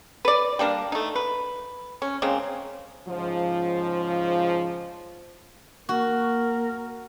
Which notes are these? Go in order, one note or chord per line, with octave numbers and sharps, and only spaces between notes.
B4 D5
G3 A#3 D4 A#4
A3 D#4
B4
C#4
C#3 G#3 A#3 C4
G#2 C#3 F3
A#3 F#4 A#4